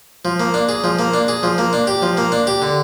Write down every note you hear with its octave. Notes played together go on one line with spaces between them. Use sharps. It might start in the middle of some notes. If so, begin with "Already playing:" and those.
F3
A#3
D4
G#4
F3
A#3
D4
G#4
F3
A#3
D4
G4
F3
A#3
D4
G4
D3